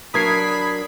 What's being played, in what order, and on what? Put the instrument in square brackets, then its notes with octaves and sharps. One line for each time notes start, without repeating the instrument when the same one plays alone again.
[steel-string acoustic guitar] F#3 D4 A#4 [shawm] B5 [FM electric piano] D#6 G#6 C7